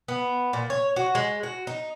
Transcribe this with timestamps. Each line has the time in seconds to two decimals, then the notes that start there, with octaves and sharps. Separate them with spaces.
0.08 B3
0.53 A#2
0.70 C#5
0.96 F#4
1.15 G#3
1.43 F#4
1.67 D#4